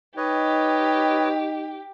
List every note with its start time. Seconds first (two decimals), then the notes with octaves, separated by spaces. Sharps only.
0.17 D#4 G4 B4 C#5 D#5